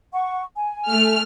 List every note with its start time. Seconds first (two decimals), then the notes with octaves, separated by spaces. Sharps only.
0.13 F#5 C#6
0.56 G#5
0.88 A3 F6